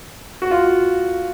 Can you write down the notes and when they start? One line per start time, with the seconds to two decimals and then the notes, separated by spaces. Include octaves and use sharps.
0.42 F#4
0.51 F4